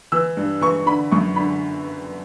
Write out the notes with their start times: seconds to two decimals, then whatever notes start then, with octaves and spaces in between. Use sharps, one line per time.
0.12 E3 E6
0.37 G2
0.61 E3 C#6
0.86 D3 B5
1.11 F#2 C#6
1.36 D3 B5